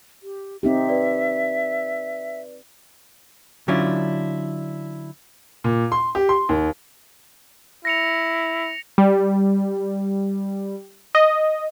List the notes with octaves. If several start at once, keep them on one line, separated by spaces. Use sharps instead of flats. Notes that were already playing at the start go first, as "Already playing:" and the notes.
G4
C4 D#4 G4 E5
B4 D5
D3 F#3 C#4 D4 E4 F4
A#2
C6
G4
C6
D#2
E4 A#6 C#7 F7
G3
D#5